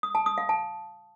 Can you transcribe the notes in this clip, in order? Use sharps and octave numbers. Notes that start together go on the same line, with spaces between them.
D#6
A5
D#6
F5
A5